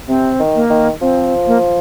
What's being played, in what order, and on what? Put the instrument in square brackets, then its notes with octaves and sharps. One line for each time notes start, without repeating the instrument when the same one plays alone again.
[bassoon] C3 [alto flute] C4
[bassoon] D#3
[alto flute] A#3
[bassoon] D#3
[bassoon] F3 [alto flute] C4
[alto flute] A#3